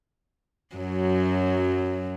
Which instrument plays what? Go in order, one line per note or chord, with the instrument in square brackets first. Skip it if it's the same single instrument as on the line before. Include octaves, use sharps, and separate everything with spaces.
[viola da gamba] F#2 F#3